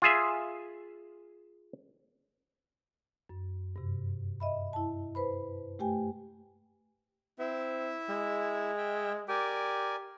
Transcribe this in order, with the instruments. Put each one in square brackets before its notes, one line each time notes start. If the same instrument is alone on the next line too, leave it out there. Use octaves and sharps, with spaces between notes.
[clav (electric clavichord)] F4 G#4 E5
[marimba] F#2
G2 C3
D#5 E5 B5
E4 A5
B4 C5 B5
A3 G4 G5 G#5
[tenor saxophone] C4 [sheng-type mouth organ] E4 E5
[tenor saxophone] G#3
[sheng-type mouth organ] E5 G5
[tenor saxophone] G4 [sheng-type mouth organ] A#4 D5 G#5